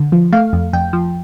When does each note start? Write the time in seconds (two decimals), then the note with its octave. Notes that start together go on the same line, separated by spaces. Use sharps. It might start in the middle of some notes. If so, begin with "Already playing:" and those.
Already playing: D3
0.12 F3
0.32 A3 F5
0.53 F2
0.73 F2 G5
0.93 F3